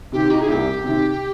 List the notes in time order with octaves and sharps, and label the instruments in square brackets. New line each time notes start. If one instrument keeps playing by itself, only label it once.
[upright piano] C3 D#3 [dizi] G4
[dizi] D#4
G#4
[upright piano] C2 [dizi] G4
[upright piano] C3 D#3